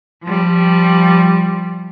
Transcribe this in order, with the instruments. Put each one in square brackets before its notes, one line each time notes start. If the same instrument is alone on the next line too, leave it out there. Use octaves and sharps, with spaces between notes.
[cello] F3 G3